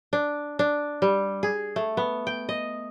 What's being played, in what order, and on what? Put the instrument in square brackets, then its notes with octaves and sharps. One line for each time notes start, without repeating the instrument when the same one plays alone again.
[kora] D4
D4
G3
G#4
A3
B3
G5
D#5